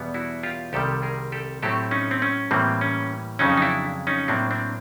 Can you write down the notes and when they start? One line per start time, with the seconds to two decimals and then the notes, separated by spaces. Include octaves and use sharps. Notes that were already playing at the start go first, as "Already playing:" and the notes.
Already playing: E2 B2 G3 B3
0.14 E4 F#4
0.43 F4 G4
0.73 C2 C3 D#3 G3 G4 A4
1.03 G#4 A#4
1.32 G4 A4
1.62 A2 F#3 A3 C4 G4 A4
1.91 C#4 D#4
2.11 C4
2.22 C#4
2.51 A2 E3 G3 A#3 C4
2.81 C#4
3.39 F2 C#3 F#3 C#4 D#4
3.57 D#4
3.62 D4 E4
4.07 C#4 D#4
4.28 A2 F#3 A#3 C4 D4
4.51 C4 D4